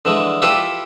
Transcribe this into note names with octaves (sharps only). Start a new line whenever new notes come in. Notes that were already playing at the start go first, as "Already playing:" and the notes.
D3 E3 G#3
E4 F4 G4 A4 B4